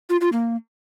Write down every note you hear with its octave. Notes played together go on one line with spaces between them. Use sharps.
F4
F4
A#3